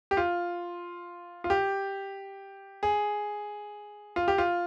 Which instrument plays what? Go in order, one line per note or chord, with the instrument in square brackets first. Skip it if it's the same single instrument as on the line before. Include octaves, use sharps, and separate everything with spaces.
[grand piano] G4
F4
F4
G4
G#4
F4
G4
F4